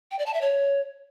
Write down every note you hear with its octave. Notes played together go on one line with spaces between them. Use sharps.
G5
D5
A5
E5
C#5